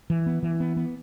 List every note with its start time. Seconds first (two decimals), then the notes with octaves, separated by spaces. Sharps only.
0.10 E3
0.26 B3
0.43 E3
0.60 B3
0.77 B3